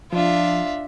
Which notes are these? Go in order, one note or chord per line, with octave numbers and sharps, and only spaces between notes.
F3 D4 F4 E5